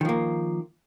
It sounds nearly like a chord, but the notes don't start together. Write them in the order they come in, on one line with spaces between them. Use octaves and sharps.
D#3 F3 A#3